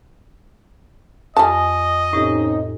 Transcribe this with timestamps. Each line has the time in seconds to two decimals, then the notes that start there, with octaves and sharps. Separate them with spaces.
1.37 F2 G3 D#5 G#5 A5
2.13 A2 C3 C#4 D#4 G4